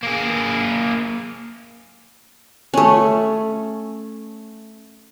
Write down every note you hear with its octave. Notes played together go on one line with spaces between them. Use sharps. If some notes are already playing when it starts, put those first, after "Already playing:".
A#3 G#4
A3 C#4